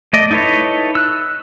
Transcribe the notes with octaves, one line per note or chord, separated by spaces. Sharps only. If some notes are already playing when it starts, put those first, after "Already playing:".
A3 D5 D#5
D#4 E4 A4 B4 C#5
E6 F#6